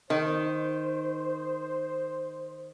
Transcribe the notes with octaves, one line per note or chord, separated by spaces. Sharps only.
D#3 C5